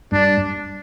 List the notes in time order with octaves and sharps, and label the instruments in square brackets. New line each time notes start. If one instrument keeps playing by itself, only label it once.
[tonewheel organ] G2 [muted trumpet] D4